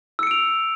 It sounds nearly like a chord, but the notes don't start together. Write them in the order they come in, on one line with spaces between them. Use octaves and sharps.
E6 C#7 D7 F7